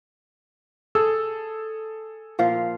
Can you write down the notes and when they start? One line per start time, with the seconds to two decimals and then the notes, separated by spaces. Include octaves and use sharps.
0.95 G#4 A4 E6
2.39 A#2 F3 F5